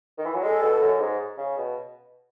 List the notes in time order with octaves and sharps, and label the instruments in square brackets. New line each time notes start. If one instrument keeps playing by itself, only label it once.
[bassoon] D#3
E3
F#3
[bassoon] G#3 [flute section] A4
[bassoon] B2
F#2
G#2
C#3
B2